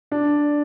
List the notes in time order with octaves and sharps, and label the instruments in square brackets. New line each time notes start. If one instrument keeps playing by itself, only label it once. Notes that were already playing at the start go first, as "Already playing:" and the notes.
[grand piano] D4